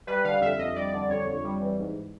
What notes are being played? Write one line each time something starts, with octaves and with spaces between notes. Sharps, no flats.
G3 B4
D3 F5
F2 E5
F2 D#5
G3 D5
D3
F2 C#5
F2
G3
E3
G#2